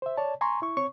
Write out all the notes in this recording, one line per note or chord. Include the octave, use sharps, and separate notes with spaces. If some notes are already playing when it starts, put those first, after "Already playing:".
C5 E5
C#5 D5 A5
G#5 A#5 C6 C#6
E4 C#6
C4 C#5 C#6